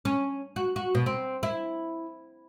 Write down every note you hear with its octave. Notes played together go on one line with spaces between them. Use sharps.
C#4
F#4
F#4
B2
C4
E4